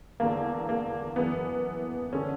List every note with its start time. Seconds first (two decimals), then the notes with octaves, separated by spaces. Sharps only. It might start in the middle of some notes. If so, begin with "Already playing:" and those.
0.20 E2 D3 A#3
0.69 A#3
1.16 F#2 E3 B3
2.13 D3 C#4